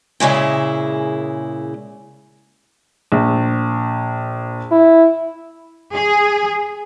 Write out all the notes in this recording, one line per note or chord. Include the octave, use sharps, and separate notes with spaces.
A#2 C#3 G#3 E4
A#1
E4
G#4